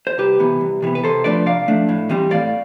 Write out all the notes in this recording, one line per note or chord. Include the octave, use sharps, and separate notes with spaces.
C5
C2 G4 B4
C3 E3 B3
C2
C3 E3 B3
B4
C3 A4 C5
F3 A3 D4 B4 D5
C3 D5 F5
F3 A3 D4
A2
E3 G3 C4
A2 D5 F5